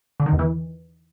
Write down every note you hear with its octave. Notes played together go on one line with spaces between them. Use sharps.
D3
D#3
E2
E3